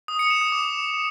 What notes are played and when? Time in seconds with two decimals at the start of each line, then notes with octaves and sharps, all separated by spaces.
0.08 D#6
0.19 C#7
0.30 E7
0.41 D#6
0.52 D6